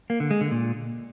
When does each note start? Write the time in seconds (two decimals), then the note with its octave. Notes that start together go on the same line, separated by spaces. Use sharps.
0.10 A#3
0.20 D3
0.31 G#3
0.41 D3
0.51 A#2